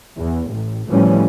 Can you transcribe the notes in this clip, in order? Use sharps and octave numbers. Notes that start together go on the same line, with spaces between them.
E2
A1
D2 A2 E3 F3 G3 C#4